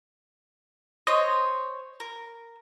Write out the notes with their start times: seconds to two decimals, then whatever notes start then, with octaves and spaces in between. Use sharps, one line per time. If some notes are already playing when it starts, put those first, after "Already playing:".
1.07 C5 C#5 D#5
2.00 A#4